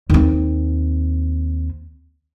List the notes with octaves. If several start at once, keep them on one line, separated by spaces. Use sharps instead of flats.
D#2 C4